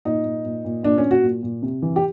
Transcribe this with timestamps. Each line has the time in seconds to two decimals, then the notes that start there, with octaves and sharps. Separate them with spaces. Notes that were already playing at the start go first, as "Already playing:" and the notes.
0.05 A#2 D#4
0.25 A#2
0.45 A#2
0.65 A#2
0.83 A#2 D4
0.98 C#4
1.04 A#2
1.11 F#4
1.23 A#2
1.43 A#2
1.63 C3
1.82 E3
1.96 G4